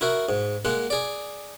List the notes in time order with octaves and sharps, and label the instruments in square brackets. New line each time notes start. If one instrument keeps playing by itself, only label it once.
[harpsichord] E4 F#4 A#4
G#2
G#3 A#3 F#5
G#4 D5